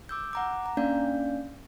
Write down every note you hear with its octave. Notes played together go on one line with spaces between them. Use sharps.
D6 E6 G6
F#5 A#5 D6
A#5
A#3 C#4 D4 D5 F5 G6